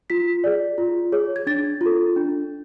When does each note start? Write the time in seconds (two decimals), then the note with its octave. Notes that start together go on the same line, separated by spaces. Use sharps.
0.10 F4 B6
0.44 G#4 D5
0.78 F4
1.12 G#4 C#5
1.36 G#6
1.47 D4 A6
1.81 F4 A4
2.16 D4